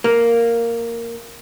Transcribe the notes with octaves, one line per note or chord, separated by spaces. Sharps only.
A#3